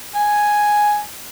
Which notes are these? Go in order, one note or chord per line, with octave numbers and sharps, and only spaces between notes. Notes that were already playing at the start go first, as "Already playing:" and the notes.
G#5